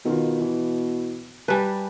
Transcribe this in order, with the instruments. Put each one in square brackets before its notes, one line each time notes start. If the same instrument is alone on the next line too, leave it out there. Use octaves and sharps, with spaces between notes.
[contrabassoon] B2 [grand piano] D#3 F4
[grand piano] E3
[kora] G3 B4 [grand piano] G#5 A5